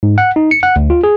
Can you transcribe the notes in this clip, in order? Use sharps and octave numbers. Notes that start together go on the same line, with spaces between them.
G#2
F#5
D#4
C#7
F#5
D2
F4
G#4